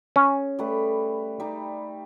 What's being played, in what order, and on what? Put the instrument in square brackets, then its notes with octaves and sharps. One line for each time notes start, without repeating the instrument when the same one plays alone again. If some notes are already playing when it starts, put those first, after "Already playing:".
[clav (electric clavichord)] C#4 [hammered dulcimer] G#4
[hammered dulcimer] G3 A3 B4
G3 D#4